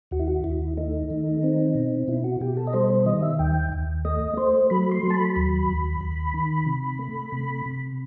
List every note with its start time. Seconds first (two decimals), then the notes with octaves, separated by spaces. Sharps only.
0.11 D#2 F#4
0.20 E4
0.28 F#4
0.44 D#2 E4
0.77 A3 D#4
1.10 D#3
1.43 C4
1.75 B2
2.08 B2 E4
2.24 F#4
2.41 B2 G4
2.57 A4
2.67 D#5
2.73 G3 C5
2.90 C5
3.06 D#3 D#5
3.22 E5
3.39 D#2 G5
3.72 D#2
4.05 A3 D#5
4.37 A3 C5
4.70 F#3 B5
4.92 C6
5.03 F#3
5.10 A5
5.14 B5
5.35 D#2 B5
5.69 D#2
6.01 D#2
6.34 D#3
6.67 C3
6.99 A3
7.32 C3
7.66 C3